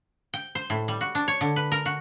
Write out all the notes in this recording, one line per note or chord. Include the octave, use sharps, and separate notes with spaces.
G5
C5
A2
G3
F#4
D4
C#5
D3
B4
A#4
F#4